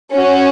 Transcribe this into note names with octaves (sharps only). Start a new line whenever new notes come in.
C#4 F#4